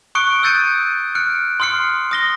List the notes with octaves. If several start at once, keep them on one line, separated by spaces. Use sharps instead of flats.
C#6 D#6 F#6 C#7 D7
D#6 E6 G6 A6 C#7 D#7
F6 F#6 C#7 D7
C6 D#6 F6 C7 C#7
D#6 A#6 G7